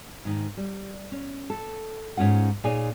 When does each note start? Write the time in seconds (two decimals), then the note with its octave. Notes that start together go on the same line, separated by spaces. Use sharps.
0.25 G#2 D#3
0.57 G3
1.12 C#4
1.50 A4
2.17 G#2 C#4 F4 F#5
2.64 A#2 D#4 G#4 C#5 D5 G#5